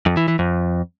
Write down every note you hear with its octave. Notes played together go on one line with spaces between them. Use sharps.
F2
E3
E3
F2